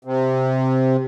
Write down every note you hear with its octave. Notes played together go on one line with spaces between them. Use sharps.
C3